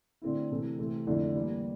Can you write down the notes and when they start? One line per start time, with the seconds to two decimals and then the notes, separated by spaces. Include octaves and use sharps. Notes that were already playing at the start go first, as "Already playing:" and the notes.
0.22 D3 A3 C4 E4
0.51 C3 E3 A3
0.79 C3 E3 A3 C4
1.07 F2 D3 A3 E4
1.35 E3 G3 A#3 E4